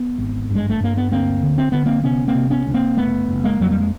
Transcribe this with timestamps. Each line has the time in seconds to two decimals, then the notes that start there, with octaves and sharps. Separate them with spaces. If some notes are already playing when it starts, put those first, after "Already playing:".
Already playing: B3
0.18 G#1
0.50 G2
0.55 G#3
0.70 A3
0.80 G2 A#3
0.97 B3
1.12 D2 A#3 C4
1.43 D3
1.58 C4
1.72 D3 B3
1.86 A#3 C4
2.04 C3 B3 C#4
2.28 A#3 C4
2.35 C3
2.50 B3 C#4
2.66 D2
2.74 A#3 C4
2.97 F#1 A3 B3
3.28 F#1
3.44 G#3 A#3
3.60 F2 F#3
3.71 G3
3.80 G#3